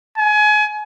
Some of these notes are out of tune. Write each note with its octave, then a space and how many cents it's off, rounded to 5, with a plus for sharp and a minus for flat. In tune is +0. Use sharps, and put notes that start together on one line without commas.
G#5 +30